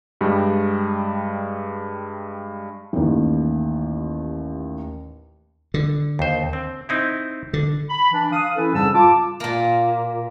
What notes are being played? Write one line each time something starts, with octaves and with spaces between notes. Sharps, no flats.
G2 G3 G#3
A1 D#2
D3
D#2 C5
C4
C4 D#4 E4
D3
B5
E3 D4
F5 D#6
E3 C#4 E4 A4 B4
F2 G#2 C#3 G3 A5 E6
F4 A5 D6
A#2 A#3